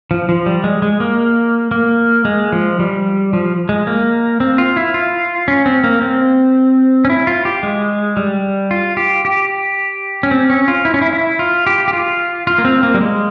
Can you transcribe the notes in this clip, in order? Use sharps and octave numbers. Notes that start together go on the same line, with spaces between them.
F3
F3
G3
G#3
G#3
A#3
A#3
G#3
F3
G3
F3
G#3
A#3
C4
F4
E4
F4
C#4
C4
A#3
C4
C#4
E4
F4
G4
G#3
G3
F4
G4
G4
C#4
C4
C#4
F4
E4
C#4
E4
E4
F4
G4
G4
F4
F4
A#3
C4
A#3
G3
G#3